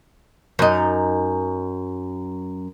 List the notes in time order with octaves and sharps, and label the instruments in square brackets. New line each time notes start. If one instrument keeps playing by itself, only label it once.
[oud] F#2 D#4